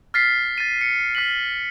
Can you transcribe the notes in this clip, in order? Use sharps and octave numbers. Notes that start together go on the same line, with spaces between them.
F6 A6 B6 C7
A6 D#7
C#7
F6 B6 F#7